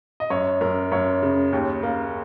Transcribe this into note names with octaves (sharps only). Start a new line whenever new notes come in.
D#5
F#2 C#5
F#2 A#4
F#2 C#5
C#3
D#2
A#3